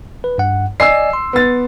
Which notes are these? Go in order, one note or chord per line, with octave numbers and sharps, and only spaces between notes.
B4
G2 F#5
D5 D#5 G#5 E6 C7
C6
B3 A6